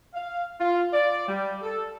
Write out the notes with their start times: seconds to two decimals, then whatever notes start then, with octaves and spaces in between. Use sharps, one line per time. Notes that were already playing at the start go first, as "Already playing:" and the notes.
0.14 F5
0.59 F4
0.92 D5
1.28 G3
1.62 A4